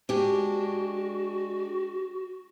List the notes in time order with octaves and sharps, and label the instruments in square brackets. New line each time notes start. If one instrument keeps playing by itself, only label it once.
[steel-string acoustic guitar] G#3 D4 G4 [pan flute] F#4